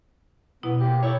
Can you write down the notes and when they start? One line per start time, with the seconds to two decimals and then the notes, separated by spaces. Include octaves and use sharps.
0.63 B2 B3 E4
0.80 A#3 G4
1.03 E4 A4 C#5